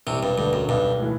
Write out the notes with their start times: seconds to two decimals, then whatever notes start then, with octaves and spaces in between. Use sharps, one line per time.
0.07 E1 C2 C3
0.23 G2
0.38 D2 G2 D3
0.53 F#2
0.69 B1 G2
0.99 A2 E3